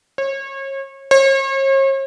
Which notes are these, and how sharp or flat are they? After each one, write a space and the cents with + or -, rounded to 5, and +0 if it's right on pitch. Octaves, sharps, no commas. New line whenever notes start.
C#5 -35
C#5 -45